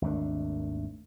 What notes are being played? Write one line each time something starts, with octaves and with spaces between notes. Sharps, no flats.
G#1 D#2 A3 D4